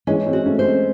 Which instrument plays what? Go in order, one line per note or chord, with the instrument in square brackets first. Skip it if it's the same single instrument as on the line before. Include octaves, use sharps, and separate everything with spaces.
[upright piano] E3 G#3 [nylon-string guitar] C#4
[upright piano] G#3 C4
[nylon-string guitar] F#4
[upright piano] A3 C#4
[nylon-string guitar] C5
[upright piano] G#3 C4